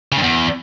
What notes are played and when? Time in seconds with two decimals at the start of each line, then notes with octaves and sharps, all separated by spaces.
0.12 C#3
0.17 G2
0.22 E2